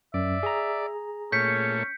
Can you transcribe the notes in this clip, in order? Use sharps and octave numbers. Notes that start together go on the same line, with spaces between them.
F#2 D5 E5
G#4 A#5
A#2 A3 C#4 C#5 G6 B6 C#7